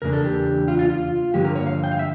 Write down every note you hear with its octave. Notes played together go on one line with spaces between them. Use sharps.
E2 C#3 A#3 D4 A#4
A4
G4
F4
F4
F4
G2 D3 F3 A#3 G4
A#4
C#5
F5
G5
F5
E5